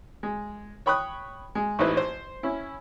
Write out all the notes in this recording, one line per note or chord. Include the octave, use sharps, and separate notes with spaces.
G#3
C#5 G5 B5 C#6 D#6 F#6
G#3
A1 D#4 E4 B4 C5
C5
C#4 E4